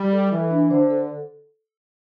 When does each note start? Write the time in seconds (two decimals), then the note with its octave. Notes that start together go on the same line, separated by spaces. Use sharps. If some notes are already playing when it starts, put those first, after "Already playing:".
Already playing: G3
0.13 A4
0.32 E3 E5
0.51 D4
0.70 D3 C5
0.90 A4